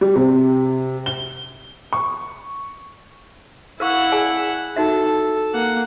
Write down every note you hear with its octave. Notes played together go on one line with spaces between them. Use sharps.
G3
C3
G7
C#6
E4 A#4 F5 F#5 C#6
G#4 D5 G#5
D#4 F#4 A4 E5
A#3 F#5